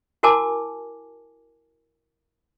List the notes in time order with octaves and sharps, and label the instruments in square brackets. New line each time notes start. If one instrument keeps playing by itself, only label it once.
[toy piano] E4 F#4 A#4 G#5 A5 D6